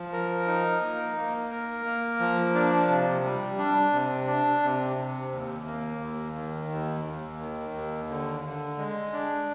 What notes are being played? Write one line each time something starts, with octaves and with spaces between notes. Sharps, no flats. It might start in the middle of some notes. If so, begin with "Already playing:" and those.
Already playing: F3
A#4
D#4
A#3
A#3
A#4
A#3
F3
D4
C3
G3
D4
C3
D4
C3
C3
D#2
A#3
D#2
D#3
D#2
D#2
D#3
D#2
D3
D3
G#3
D4